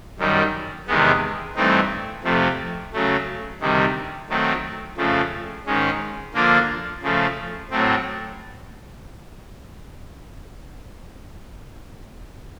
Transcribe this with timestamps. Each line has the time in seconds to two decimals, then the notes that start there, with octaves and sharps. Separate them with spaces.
0.19 F#2 D#3 G3
0.87 E2 C3 D#3 G#3 B3
1.56 G2 E3 A3 C4 D#4
2.24 F2 C3 F3 A3
2.93 C#3 F#3 A3
3.60 D2 C3 D#3 G3
4.30 D#3 F#3 A3 C4
4.97 F2 C#3 F3 A3
5.66 G#2 D#3 G#3 C#4
6.34 D3 F3 A#3 D4 F4
7.03 C#3 F3 A3
7.70 A2 F#3 A3 C4